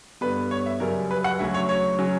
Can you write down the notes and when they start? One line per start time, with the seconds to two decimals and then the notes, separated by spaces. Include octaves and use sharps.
0.21 G2 D3 G3 B3 B4
0.51 C#5
0.66 E5
0.80 F#2 C#3 G3 C#4 A#4
1.11 B4
1.24 F#5
1.39 D2 C#3 F#3 E5
1.54 C#5
1.69 C#5
1.99 C#3 F#3 C#4